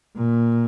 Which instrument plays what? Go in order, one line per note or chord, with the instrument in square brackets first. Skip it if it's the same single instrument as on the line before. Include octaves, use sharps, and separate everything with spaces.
[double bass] A#2